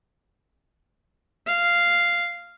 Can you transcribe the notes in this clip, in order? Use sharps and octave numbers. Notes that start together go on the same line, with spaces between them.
F5